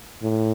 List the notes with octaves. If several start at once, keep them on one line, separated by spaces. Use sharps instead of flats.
A2